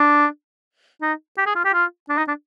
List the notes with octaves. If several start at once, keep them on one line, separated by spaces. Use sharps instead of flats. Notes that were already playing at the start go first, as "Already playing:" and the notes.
Already playing: D4
D#4
G4
G#4
F4
G4
F4
D4
D#4
D4